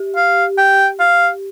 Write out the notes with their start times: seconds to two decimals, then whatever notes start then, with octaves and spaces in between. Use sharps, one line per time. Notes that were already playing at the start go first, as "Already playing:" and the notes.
Already playing: G4
0.16 F5
0.58 G5
1.00 F5